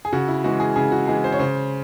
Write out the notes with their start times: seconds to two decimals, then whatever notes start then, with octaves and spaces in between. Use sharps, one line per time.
0.05 G#4
0.13 C#3 F#4
0.28 E4
0.44 E3 G#3 F#4
0.60 G#4
0.76 C#3 G#4
0.92 F#4
1.08 E3 G#3 G#4
1.24 C5
1.33 C#5
1.39 C#3 C5